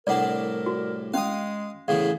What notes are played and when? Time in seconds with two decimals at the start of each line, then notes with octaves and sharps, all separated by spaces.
0.07 C2 A2 D4 A#4 D5 F#5
0.66 F#4
1.14 G#3 C#4 F5 D#6
1.88 E2 A2 C#3 G#4 F5